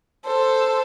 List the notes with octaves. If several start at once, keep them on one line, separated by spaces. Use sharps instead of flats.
A4 C5